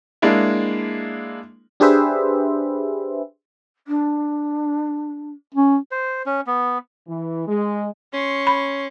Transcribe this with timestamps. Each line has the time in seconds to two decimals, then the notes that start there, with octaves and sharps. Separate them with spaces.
0.22 G#3 A#3 D4 E4
1.80 D4 G4 G#4 B4 C5 E5
3.88 D4
5.55 C#4
5.91 C5
6.26 C#4
6.47 B3
7.07 E3
7.47 G#3
8.14 C#4 C6 C#6
8.47 B5